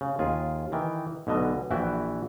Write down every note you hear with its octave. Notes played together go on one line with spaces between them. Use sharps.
C#3
D#2 F4 G#4
D#3 E3 G5
B1 B2 D3 D#5
A#1 E3 E4 F#4 G5